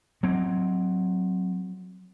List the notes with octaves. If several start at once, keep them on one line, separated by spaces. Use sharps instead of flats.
F#3 C4